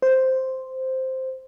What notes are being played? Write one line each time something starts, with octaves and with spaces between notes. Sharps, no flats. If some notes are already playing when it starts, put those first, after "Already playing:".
C5